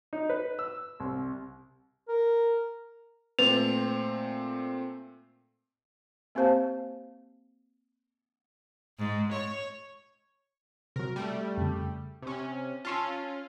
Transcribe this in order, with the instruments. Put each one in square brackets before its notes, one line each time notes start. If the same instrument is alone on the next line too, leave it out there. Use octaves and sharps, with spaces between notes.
[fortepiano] D#4
B4
E6
C2
[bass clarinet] A#4
[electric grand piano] A#2 A3 C4 [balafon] B4 [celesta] F7
[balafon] A#3 C4 G4 C5 F5 A5
[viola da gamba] G#2
C#5
[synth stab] C3 F#3 [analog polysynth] A#4
[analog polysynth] G3 A3
[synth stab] F2 C#3
[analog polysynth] C3 C#4
[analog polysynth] C#4 F4 [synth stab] A5 C6 E6